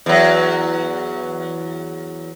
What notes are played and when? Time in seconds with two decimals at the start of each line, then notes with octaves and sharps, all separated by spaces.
0.06 E2 F#3